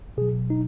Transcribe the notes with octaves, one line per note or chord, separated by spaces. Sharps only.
B2 F#3 G#4
D#4